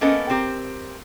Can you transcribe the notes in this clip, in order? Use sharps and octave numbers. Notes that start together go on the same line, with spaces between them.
A#3 B3 C#4 A4 A#4 D#5
C4 G4 A#4